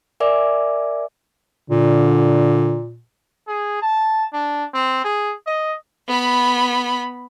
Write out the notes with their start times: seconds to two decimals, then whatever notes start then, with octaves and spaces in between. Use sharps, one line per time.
0.20 A#4 D5 E5 G#5 D6
1.70 A#2 D3
3.47 G#4
3.82 A5
4.33 D4
4.74 C4
5.04 G#4
5.47 D#5
6.08 B3 B5